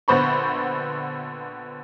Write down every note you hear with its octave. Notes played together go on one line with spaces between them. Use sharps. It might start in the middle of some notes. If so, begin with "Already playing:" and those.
A#1 D3 B3 C5 B5 C#6